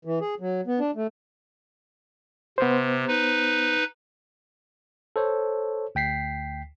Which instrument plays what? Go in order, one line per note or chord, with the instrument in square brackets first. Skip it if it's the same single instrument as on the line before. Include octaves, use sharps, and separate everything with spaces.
[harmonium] E3
G#4
F#3
B3
D4
A3
[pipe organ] C3 [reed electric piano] B3 C5
[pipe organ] D#4 B4
[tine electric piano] A4 C5 C#5
D2 G5 B6 C7